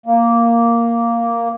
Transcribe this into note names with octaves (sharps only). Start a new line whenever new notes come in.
A#3